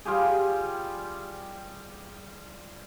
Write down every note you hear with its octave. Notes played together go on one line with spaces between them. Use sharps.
G3 F4 G4 G#4